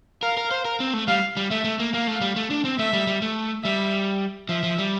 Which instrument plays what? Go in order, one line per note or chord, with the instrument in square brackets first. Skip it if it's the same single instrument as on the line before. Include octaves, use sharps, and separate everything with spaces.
[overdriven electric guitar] A#4 [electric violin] F5
[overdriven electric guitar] A#4
C5
A#4
C4
A3
[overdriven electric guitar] G3 [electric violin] F5
[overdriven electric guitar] G3
[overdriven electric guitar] A3 [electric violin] E5
[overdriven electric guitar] A3
A#3
[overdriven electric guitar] A#3 [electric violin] F5
[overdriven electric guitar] A3
G3
A3
D4
C4
[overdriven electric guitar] A3 [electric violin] E5
[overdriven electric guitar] G3
G3
A3
[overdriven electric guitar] G3 [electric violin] E5
[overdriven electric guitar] F3 [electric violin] E5
[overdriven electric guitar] F3
G3